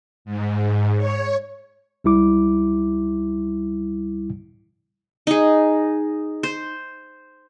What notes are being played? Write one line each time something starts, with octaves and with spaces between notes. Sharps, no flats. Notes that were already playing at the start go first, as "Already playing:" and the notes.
G#2
C#5
C#2 G3 E4 D6
D#4 G#4
C5